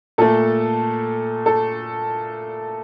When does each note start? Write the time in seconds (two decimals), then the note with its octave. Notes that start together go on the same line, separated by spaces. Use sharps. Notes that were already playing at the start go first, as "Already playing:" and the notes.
0.18 A#2 A3 A4
1.46 A4